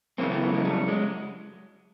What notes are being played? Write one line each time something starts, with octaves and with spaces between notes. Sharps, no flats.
F#2 C#3 E3 A#3 C4
A3 B3
A3 B3
G#3 A#3
G3 A3
F#3 G#3